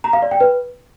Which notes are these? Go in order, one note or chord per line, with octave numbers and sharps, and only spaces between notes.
A#5
F5
D5
G5
B4